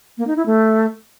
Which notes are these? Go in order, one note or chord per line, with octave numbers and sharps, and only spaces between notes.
A#3
D#4
E4
A3